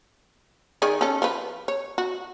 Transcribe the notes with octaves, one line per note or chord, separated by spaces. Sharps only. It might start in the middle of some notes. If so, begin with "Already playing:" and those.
D#3 G#4 D5
C#4 A4
F3 B4
C#5
F#4